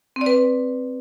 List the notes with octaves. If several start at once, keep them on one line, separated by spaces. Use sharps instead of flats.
C4
D5
B4